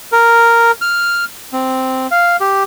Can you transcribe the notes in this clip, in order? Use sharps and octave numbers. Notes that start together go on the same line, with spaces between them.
A#4
F6
C4
F5
G4